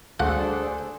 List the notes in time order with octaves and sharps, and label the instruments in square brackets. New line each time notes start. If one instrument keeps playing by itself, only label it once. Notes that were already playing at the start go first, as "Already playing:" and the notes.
[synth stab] D2 [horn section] D4 A4 [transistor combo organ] G#4 C5 [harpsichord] F#5